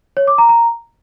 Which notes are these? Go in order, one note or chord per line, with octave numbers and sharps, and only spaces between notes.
C#5
D6
A#5
A#5